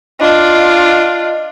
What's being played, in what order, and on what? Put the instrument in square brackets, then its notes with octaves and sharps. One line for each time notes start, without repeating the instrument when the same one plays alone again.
[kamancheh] D4 F4 [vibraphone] D#5